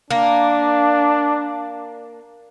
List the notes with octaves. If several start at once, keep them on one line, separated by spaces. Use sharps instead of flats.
A#3 D4